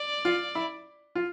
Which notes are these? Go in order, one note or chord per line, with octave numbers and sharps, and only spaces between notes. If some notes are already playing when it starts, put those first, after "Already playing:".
Already playing: D5
F4
E4
F4